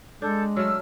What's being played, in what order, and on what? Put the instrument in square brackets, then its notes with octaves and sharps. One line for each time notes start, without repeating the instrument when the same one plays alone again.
[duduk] G#3 [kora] D4 [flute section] A4 G6
[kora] F#3 A3 [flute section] E6 F6